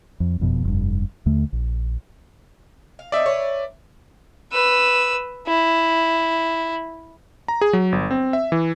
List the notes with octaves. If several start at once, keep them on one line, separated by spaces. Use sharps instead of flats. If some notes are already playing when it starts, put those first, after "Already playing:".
F2
F#1 F2 B2
F1 G2
D#2 D3 A3
A#1
F5
C4 D4 D#4 D5 E5
B4 C#5
B4 E6
E4
A#5
G#4
F#3
G1
C4
E5
E3